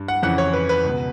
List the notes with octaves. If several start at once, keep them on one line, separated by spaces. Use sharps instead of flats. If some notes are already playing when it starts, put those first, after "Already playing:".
Already playing: G2
F#5
F2 C#3 E3 F#5
C#5
B4
B4
C#2 B2